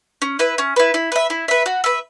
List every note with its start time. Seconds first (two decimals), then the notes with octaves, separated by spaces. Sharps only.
0.22 C#4
0.39 E4 B4
0.58 C#4
0.76 E4 B4
0.94 E4
1.12 B4 E5
1.30 E4
1.48 B4 E5
1.66 F#4
1.84 B4 E5